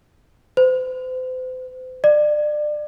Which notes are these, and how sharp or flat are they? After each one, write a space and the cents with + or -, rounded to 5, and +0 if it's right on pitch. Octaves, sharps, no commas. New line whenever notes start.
C5 -40
D5 +30